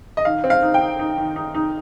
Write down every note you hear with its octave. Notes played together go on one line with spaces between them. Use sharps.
D#5
D#3 F5
C4
F5
D#4
G5
D#4
D#4
D#3
D#4
D#4